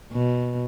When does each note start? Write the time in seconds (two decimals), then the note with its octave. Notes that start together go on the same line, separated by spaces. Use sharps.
0.12 B2